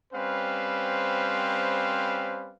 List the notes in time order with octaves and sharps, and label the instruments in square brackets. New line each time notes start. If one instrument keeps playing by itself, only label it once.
[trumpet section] G3 C4 C#4 B4 C5 F5